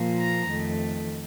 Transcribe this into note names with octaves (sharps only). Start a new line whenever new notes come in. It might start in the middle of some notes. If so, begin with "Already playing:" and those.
Already playing: A#2 F3 A#3
A#5
F2 D#3 A3